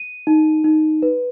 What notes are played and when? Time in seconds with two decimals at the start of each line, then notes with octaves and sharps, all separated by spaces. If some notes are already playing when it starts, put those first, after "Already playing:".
Already playing: D#7
0.27 D#4
0.64 D#4
1.02 B4